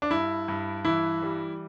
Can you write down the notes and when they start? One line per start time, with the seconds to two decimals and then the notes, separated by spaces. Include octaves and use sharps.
0.02 D4
0.11 G2 E4
0.48 G2
0.85 E3 E4
1.22 G3